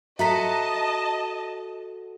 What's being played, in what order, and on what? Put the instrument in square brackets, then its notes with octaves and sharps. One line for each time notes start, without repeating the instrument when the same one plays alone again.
[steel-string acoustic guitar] F#4 A4 C5 [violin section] D#5 A5 [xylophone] E5 A#5 B6